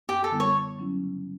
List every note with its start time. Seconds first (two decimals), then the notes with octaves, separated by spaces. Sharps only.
0.09 F#2 G4
0.24 A4
0.31 D3 G3 B3 E4
0.40 C#5
0.55 D3
0.79 F#3 C#4 E4
1.02 C#3